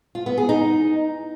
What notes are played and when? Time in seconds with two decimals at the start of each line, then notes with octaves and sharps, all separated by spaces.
0.15 F4
0.26 B3
0.38 G#4
0.49 D#4